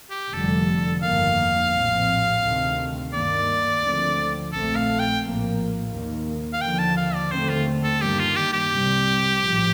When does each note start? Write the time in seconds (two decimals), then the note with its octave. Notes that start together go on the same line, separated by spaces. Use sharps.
0.10 G4
0.33 F1 F2 D3 G3 A4
1.02 G1 F2 D#3 A#3 F5
1.73 A#1 A2 F3 C4
2.43 D2 C3 D#3 A3 C4
3.12 G2 D#3 A#3 D5
3.82 D2 D3 F3 C4
4.52 A#1 A#2 A3 C4 A4
4.76 F5
4.99 G5
5.22 A#1 A2 F3 A#3
5.91 D#2 D#3 A#3
6.53 F5
6.61 D#2 D3 F3 G5
6.79 A5
6.97 F5
7.14 D5
7.31 D#2 D3 A3 C4 C5
7.49 F4
7.83 A4
8.01 G2 D#3 G3 A#3 G4
8.19 F4
8.36 G4
8.53 G4
8.71 C2 C3 G3 C4
9.41 A#1 A2 F3